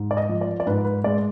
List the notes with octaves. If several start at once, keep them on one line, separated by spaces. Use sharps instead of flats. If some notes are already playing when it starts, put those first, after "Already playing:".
Already playing: G#2
D5
D#5
F3
D5
D5
G#2 B4
B4
G#3 D5